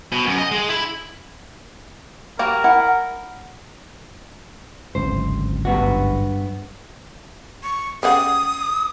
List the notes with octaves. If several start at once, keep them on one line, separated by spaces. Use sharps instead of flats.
B2
F#2
D#5
G#3
E4
G3 A#3 F#4 A#4
E4 F#5
D1 G#1 C#2 C5
G2 B3 F#4
C#6
C#3 G3 F#5 D#6